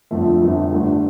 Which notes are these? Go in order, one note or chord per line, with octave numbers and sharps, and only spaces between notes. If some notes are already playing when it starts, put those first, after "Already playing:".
G1 F2 D3 F3 A3
G1 F2 D3 F3 A3
G1 G2 D3 A3